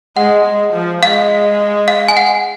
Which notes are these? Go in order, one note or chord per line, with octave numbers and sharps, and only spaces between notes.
G#3 F#5
G#3
F3
G#3 F5
F5
G#5
F#5